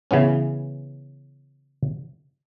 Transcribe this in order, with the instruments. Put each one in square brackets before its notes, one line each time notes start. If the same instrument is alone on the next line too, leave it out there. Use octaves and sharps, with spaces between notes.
[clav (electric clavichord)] C#3 E3 B3 C#4